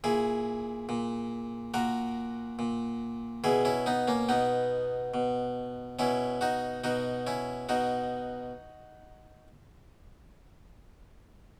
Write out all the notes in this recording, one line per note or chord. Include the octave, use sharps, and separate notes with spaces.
A#2 E4 G#4
A#2
A#2 F#4 A#4
A#2
B2 E4 G#4
C#4 E4
B3 D#4
A#3 C#4
B2 B3 D#4
B2
B2 C#4 E4
D#4 F#4
B2 D#4 F#4
C#4 E4
B2 D#4 F#4